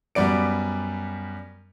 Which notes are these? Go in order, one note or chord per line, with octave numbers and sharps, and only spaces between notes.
F#2 G3 B3 D5 D7